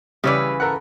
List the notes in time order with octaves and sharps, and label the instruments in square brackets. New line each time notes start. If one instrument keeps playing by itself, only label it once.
[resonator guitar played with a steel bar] C#3 E3 B4 [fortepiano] G3 C#5 D5
[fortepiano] A4 A#4 F#5